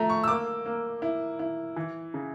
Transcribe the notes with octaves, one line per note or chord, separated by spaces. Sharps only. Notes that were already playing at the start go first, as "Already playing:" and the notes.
Already playing: F3 A3 A#5
C#6
E6
A#3 D6
A#3
E4
E4
E3
C#3